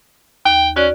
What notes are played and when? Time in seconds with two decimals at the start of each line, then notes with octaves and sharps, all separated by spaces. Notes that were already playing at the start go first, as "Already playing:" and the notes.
0.45 D#2 G5
0.76 C#4 F#4 D5